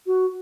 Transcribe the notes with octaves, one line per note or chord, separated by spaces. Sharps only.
F#4